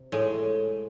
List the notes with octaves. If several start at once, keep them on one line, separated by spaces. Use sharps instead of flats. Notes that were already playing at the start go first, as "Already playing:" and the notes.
Already playing: C3
A2 G#3